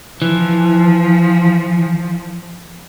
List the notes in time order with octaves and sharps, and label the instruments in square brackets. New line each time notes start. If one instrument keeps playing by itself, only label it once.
[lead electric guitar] E3 [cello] F3